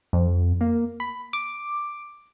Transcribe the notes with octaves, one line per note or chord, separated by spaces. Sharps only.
F2
A#3
B5
D6